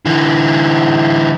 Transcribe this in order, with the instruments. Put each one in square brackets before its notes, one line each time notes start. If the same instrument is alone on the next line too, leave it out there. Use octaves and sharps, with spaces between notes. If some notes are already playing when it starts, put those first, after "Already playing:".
[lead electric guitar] D3 E3